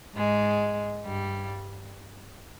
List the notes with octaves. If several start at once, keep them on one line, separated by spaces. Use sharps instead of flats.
G#2 G#3
G2 G3